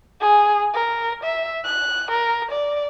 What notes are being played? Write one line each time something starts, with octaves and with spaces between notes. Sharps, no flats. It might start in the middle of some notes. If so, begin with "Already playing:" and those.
G#4
A#4
E5
F#6
A#4
D5